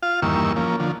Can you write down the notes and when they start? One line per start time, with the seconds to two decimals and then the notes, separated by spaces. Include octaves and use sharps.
0.03 F4 F5
0.22 E2 G2 D#3 A#3 C#6 E6
0.56 F3 A#3 C#4
0.80 D3 F3